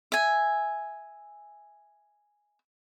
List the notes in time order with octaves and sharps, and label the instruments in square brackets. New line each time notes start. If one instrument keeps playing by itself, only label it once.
[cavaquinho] E5 G#5